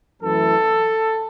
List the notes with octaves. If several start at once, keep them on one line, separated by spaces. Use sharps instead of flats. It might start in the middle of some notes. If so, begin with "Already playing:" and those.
F#2 E3 A3 E4 A4